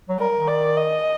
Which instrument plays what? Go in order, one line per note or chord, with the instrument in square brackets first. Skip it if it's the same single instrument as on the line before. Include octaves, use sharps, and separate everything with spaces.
[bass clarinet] F#3
[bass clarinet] G3 [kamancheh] A#4
[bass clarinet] D#3
[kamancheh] D5
D#5